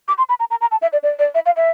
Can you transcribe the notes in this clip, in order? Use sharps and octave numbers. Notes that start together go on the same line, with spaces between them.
D6
C6
B5
A#5
A#5
A#5
A5
E5
D5
D5
D5
E5
F5
E5